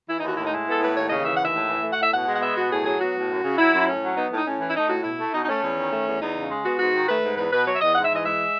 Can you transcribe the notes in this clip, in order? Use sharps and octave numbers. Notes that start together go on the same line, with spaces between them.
E3 E4
D#4
D#2 F#4
A2 E4
D#4
G#3 E4
B3 A4
A2 B4
D#2 C#5
C#3 D#5
E3 E5
D#2 F#5
E5
A2
E3
A3
F#5
A2 E5
B2 F#5
G#3
F#5
B3 E5
B2 F#4
A2 G#4
F#3 G#4
B3 F#4
A2
F#2
C#3
F#3 E4
F#2
A2 C#4
F#3
B3 D#4
A2 D#4
A2 C#4
E3
E4
A3 D#4
A2 F#4
B2 E4
A3
B2 D#4
D#4
A3 C#4
E2
D#3
A3
E2
E2 D#4
C#3
G#3
B3 F#4
G#2 F#4
D#3
A3 B4
G#2
E2 B4
B2 B4
F#3 C#5
E5
E2 D#5
G#2 F#5
E5
E3 D#5
G#3 E5